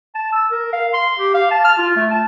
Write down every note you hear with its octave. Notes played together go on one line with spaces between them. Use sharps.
A5
E6
A#4
F5
C6
G4
F5
A5
F6
F4
A3
A5